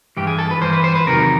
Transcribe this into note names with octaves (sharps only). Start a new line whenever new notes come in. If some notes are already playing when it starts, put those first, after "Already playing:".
G2 E3 G4
G#4
A4
B4
G2 E3 C5
B4
C5
B4
E2 C3 D#3 F#3 A#4